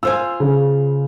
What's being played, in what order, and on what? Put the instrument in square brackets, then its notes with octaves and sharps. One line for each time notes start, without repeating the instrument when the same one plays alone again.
[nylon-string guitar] F4 C5 G#5 [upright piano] E6
[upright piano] C#3